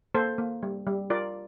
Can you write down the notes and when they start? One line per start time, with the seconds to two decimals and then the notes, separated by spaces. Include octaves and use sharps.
0.15 A#3 A4 C5
0.38 A#3
0.63 G3
0.87 G3
1.10 F4 A#4 D5